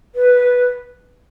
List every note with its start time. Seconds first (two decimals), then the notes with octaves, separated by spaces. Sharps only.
0.15 B4